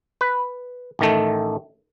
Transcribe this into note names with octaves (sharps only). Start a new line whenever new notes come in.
B4
A1 D#3 A3